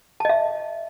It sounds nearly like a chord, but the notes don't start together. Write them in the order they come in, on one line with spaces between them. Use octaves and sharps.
A5 D#5 E5